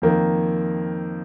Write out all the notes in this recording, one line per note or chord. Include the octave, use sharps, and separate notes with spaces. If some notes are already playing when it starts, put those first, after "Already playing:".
F2 D#3 A#3